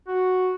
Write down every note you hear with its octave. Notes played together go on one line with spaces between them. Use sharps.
F#4